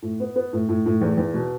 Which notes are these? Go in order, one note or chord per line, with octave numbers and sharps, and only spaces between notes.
A2
B3
B3
A2
A2
A2
E2
E2
B2